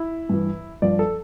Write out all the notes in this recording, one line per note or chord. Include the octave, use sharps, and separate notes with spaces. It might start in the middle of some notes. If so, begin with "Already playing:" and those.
Already playing: E4
G2 E3
G2 F3 D5
A4